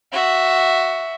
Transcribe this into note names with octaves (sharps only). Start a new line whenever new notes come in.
F#4 E5